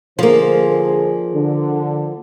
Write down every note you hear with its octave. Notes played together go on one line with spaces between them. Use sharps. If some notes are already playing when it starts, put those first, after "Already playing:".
D3 F3 A#3 G#4 C5
D3